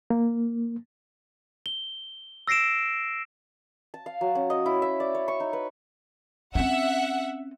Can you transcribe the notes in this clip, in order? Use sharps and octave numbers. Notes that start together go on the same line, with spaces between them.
A#3
G7
E6 A#6 C7 D7 E7
A5
F5
F#3
C#4
D#5
E4
E5
D5
C#5
C#6
D#4
B4
C4 C#4 E5 F#5